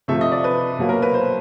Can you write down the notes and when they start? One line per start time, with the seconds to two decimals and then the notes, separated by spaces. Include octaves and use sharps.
0.08 C3 F3 A3 E5
0.21 D#5
0.32 D5
0.44 B4
0.79 B2 F#3 A#3
0.89 A#4
1.02 B4
1.14 C5